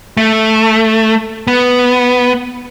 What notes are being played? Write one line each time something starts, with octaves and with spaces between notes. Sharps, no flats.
A3
B3